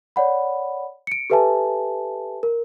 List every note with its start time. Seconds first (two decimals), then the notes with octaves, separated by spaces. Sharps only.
0.16 C#5 D5 F#5 B5
1.07 C#7 D7
1.30 G4 A4 B4 E5 G#5 A5
2.43 A#4